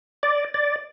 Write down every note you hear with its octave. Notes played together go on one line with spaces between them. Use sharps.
D5
D5